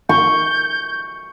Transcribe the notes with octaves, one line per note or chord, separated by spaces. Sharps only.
C#6 G6